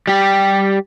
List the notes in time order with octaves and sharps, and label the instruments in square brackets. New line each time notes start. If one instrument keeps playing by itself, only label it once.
[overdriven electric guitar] G3 G4